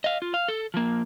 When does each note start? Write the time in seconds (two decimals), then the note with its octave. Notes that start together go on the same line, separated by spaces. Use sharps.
0.04 D#5 F5
0.22 F4
0.34 F5
0.48 A4
0.74 F3 A#3